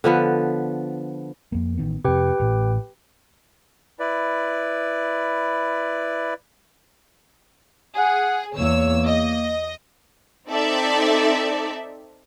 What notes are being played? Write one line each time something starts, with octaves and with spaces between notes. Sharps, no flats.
D3 F3 B3 B4
F2 A#3
A1 D#3 B3
F2 C3 G4 B4 G5
A1 A2
E4 B4 D5
G#4 F#5
E2 A#3 C#5 E6
D#5
C4 D#4 A4 D5 E5